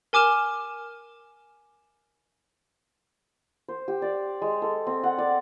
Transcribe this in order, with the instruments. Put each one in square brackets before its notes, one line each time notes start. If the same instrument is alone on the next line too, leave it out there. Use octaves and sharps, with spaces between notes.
[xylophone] A#4 G#5 D6 F6 E7 G7
[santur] C5
G4
D5
G#3
A4
C4
F#5
D5